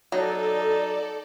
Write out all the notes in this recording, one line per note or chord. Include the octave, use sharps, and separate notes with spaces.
F#3 D#4 A4 D5 A5